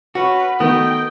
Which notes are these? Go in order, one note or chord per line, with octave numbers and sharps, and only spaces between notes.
C#4 F#4 B4
D#3 A3 B3 F#4 D#5 G5